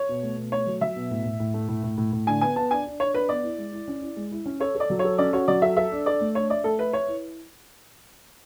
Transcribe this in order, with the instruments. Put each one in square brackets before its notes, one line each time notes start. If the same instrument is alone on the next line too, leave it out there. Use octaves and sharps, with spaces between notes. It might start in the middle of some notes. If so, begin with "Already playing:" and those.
Already playing: [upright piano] C#5
[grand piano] B2
A3
B2
[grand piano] A3 [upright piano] C#5
[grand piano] F#3
[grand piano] F#3 [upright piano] E5
[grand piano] B2
A2
A2
A2
A3
A2
A2
A2
A2
[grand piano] D3 [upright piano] G#5
[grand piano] B3 [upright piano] G#5
[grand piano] B3 [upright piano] A5
[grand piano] D4 [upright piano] G#5
[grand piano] D4
[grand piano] D4 [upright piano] C#5
[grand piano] D4 [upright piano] B4
[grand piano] B3 [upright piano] D5
[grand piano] E4
G#3
E4
C#4
E4
G#3
E4
C#4
[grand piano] A4 [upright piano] C#5
[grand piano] A4
[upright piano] D5
[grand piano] F#3
[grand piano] A4 [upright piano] C#5
[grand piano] C#4 [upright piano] D5
[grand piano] F#4 [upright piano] C#5
[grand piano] F#3 [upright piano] D5
[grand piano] A4 [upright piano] E5
[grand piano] A4 [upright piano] E5
[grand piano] D4
[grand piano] A4 [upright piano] D5
[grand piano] A3
[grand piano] D4 [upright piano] C#5
[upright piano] D5 [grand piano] E5
[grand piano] A3 [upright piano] A4
[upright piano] B4 [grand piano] E5
[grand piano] B4 [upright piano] C#5
[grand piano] E4